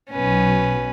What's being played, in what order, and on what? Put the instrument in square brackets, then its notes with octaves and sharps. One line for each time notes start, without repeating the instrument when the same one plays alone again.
[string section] B1 B2 [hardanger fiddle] C#4 B4